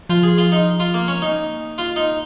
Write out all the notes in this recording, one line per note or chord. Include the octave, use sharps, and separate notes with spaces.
F3 F4
G#4
F4
D#4
F4
A#3
C#4
A#3 D#4
F4
D#4